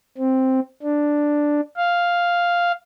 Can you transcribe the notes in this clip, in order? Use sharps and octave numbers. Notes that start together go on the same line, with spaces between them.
C4
D4
F5